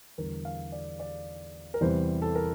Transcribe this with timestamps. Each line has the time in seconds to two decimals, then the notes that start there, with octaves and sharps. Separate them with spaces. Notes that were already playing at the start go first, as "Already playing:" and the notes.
0.18 E2 D3 G3 A#4
0.45 F5
0.72 D5
1.00 D5
1.74 A#4
1.81 E2 C3 E3 G3 C5
2.22 A4
2.35 A#4